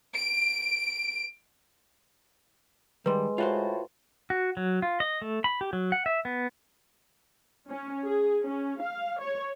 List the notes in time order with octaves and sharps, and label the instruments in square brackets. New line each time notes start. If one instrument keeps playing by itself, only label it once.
[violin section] D7
[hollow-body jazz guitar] D#3 G3 [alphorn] G#3 [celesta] B4 C6
[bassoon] A2 [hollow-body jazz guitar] F4 F#4 C5
[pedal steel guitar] F#4
F#3
F4
D#5
A3
B5
G4
F#3
F#5
E5
B3
[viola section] C#4
G#4
C#4
F5
C#5